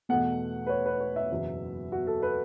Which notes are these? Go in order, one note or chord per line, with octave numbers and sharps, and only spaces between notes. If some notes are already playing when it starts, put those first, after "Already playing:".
E2 B2 A3 F#5
B4
C#5
B4
C#5
E5
F#1 E2 B2 F#3
F#4
A4
B4